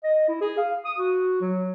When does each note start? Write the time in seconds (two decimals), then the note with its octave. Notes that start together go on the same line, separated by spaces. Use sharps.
0.04 D#5
0.28 E4
0.41 G#4
0.57 F5
0.85 D#6
0.98 F#4
1.41 F#3